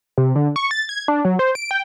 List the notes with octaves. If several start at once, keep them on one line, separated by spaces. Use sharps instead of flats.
C3
D3
C#6
A6
G#6
D4
F#3
C5
D7
G5